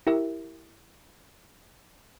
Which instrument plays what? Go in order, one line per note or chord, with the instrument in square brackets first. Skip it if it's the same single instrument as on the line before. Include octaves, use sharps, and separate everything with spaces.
[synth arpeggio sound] E4 G4 A#4 E5